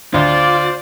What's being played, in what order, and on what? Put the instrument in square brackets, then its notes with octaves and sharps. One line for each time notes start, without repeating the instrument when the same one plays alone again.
[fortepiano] D2 [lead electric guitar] F4 [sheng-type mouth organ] C5 [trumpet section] D5